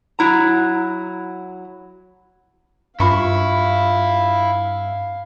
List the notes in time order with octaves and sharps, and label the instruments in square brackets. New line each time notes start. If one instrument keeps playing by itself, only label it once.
[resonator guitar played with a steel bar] F#3 E4 A#5
[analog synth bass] G2 [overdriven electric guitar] E4 [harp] F4 B5 C#6 [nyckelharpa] F5